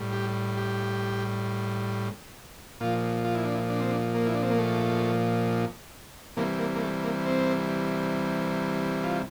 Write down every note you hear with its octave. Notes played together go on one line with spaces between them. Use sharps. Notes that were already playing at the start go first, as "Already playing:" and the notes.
Already playing: A2 G3
G4
G4
A#2 F3 F4
F4
E4
D4
E4
D4
C4
D4
A#3
E4
D4
C4
A#3
A3
C3 E3 G3 A#3
A#3
A#3
A3
A#3
C4
F4